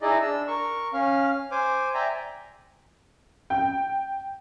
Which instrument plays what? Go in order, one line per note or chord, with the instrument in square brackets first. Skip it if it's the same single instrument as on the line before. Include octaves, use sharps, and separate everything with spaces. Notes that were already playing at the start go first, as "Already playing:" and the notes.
[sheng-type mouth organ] D#4 E4 G#4 D5 D#5
D4 E6
A#4 C#6
C#4 F5
C5 G#5 D6
D5 E5 G5 G#5 A#5
[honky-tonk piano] G5